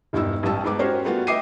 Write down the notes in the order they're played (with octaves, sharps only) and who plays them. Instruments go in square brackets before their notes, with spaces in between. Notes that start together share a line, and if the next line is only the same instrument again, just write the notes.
[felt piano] E1 G2 D#4 E4 E6
A1 E3 G3 A5 E6
G#2 B3 B4 D6
C#4 F#4 G4 A#4 C5 C#5
G3 A3 B3 F4 F#4
D#5 E5 G5 D6 C7 D#7